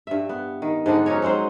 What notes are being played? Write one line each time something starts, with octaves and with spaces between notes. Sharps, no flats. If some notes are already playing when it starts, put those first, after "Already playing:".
G2 E5
B3
D#3
G#2 D3 D4 D#4
F#3 C#4 D#4 C#5
F#3 G#3 C4 C5